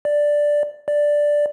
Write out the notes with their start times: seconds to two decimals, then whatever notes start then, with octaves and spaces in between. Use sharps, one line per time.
0.05 D5
0.88 D5